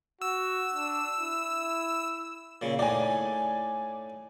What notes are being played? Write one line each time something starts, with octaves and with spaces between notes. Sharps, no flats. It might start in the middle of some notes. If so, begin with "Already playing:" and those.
F#4 E6
D4
E4
A#2 C#3
A2 D#4 D5 G#5